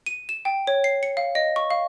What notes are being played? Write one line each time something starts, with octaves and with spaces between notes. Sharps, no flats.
D#7
E7
G5
C#5
C7
C#7
F5
D#5
C#6
F5